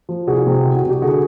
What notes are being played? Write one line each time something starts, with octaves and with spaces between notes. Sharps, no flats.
F3
C2 F#4 G#4
C3
C2
F#4
C2
G4
D3 F#4 G#4